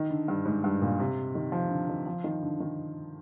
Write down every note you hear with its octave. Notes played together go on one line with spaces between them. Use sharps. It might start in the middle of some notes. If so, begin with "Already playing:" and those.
Already playing: D#3
D3
G2
G#2
G2
A#2
C3
D#3
F3
D3
D#3
F3
D#3
D3
D#3